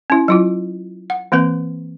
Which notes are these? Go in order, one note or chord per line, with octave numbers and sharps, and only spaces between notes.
C#4 E4
F#3 E4 F4
F#5
E3 A#3 C4 B4